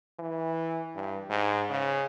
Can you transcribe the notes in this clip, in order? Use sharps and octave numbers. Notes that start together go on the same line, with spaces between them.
E3
G2
G#2
C#3